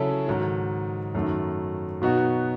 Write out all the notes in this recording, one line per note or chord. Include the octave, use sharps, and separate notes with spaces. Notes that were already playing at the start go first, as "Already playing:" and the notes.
Already playing: C#3 F#3 C#4 E4 A4
G#2 D#3 F#3
F#2 D#3 A3
B2 F#3 B3 D#4 F#4